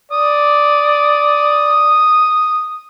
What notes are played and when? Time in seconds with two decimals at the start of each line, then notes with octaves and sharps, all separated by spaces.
0.12 D5 D#6